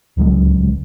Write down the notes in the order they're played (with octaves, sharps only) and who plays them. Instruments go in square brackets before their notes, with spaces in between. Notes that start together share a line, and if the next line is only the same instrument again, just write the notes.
[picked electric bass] D1 C#2 F#3 G#3